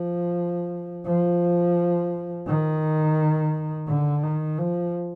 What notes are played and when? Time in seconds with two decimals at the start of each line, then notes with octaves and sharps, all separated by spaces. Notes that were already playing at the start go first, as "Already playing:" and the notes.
Already playing: F3
1.06 F3
2.47 D#3
3.88 D3
4.23 D#3
4.58 F3